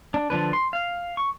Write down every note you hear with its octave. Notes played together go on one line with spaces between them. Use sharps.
D4
D3 F3 D4 B4
C6
F5
C#6